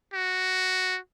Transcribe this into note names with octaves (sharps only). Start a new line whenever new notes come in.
F#4